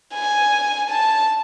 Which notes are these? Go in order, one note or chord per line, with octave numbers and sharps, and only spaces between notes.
G#5
A5